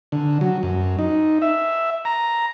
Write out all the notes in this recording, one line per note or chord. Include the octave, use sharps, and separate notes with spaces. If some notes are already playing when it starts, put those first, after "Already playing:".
D3
F#3
F#2
D#4
E5
A#5